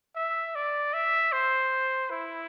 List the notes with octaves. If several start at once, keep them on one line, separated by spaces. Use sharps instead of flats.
E5
D5
E5
C5
E4